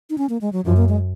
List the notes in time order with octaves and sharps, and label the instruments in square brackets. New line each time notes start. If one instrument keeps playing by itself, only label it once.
[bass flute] D#4
C#4
A#3
G#3
F#3
[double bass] F#2 [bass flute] F3
[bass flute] A#3
G#3